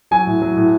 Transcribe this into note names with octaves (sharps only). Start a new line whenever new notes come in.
F#3 G#5
A2
F#3
A2